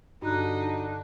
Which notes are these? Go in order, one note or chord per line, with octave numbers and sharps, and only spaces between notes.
G2 D3 D4 D#4 F#4 A#5 F#6